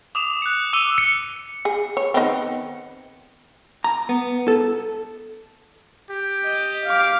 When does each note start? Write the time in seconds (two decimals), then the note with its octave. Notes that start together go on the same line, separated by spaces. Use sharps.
0.15 D6 D#6 E7 F7
0.42 F#6 C#7
0.73 D6 E6 D#7 F7 G7
0.98 C#7
1.65 G#4
1.97 C#5
2.14 D#3 B3 C4
3.84 A#5
4.09 B3
4.48 A4
6.10 G4
6.44 D#5
6.85 F5 D6